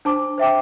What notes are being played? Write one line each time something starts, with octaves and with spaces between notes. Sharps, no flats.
D4 C5 A5 D6
C5 E5 G5 D6